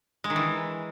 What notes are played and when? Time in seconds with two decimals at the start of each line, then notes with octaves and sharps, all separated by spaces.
0.24 G#3
0.30 D#3
0.36 E3